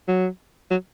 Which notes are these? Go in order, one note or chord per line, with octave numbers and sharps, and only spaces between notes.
F#3
F#3